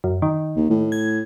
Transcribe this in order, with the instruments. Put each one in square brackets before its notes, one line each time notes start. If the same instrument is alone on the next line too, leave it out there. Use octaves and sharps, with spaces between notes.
[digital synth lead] F#2
D#3
[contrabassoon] D#2
A2
[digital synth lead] G#6